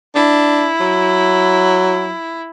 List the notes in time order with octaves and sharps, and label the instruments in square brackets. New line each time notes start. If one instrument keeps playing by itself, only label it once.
[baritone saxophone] D4 [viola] E4
[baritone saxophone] F#3